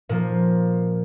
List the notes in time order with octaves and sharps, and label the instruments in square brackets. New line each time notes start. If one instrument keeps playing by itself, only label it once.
[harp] A#2 F3 A#3